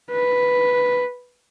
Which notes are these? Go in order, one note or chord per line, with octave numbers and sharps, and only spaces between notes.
B4